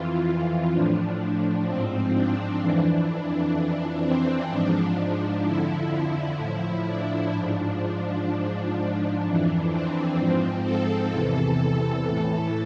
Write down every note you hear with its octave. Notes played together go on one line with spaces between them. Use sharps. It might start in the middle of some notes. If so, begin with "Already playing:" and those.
Already playing: F2 E3 F4
A2 F3 D4
G#2 F3 C4
D4
F2 E3
D4
F2 E3
C4
G#2 F3 D4
D4
F2 D3 F3 E4
A2 F3
D4
G#2 F3
D4
G#2 F3
F2 E3
C4
G#2 F3
A4
E2 C3 E3
A4
A2 E3